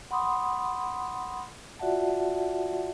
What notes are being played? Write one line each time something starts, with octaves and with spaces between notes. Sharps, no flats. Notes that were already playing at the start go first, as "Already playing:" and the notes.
F#5 B5 C6 D6 D#6
F4 F#4 D5 E5 F#5 A5